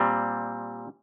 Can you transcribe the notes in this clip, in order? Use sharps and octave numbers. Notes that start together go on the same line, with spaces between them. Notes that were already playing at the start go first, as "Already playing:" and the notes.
Already playing: A#2 G3 C4